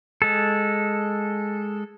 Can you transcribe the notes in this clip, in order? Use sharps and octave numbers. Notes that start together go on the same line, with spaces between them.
G#3 A4